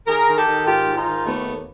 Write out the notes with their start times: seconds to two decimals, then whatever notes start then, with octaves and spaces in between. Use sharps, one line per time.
0.07 D#3 G#4 A#4
0.27 D#3
0.37 G4 A4
0.47 D#3
0.66 G#2 F4 G4
0.86 G#2
0.96 D#4 F4
1.07 D#3
1.25 D#2 A3 B3
1.47 D#2